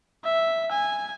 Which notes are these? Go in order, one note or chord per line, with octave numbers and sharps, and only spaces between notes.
E5
G#5